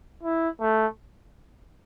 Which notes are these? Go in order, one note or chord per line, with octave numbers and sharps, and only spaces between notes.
E4
A3